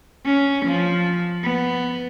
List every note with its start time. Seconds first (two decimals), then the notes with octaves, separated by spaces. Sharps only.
0.25 C#4
0.65 F3
1.44 B3